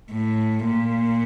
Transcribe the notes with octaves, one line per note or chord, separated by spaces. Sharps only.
A2
A#2